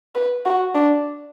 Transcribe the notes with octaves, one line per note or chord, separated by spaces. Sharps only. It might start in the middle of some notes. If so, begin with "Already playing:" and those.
B4
F#4
D4